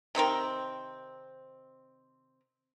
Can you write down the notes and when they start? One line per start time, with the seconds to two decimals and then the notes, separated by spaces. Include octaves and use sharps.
0.15 C3 D#3 C4 A#4